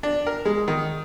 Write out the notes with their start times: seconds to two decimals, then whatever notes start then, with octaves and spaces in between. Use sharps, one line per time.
0.03 D4
0.26 A#4
0.45 G#3
0.68 D#3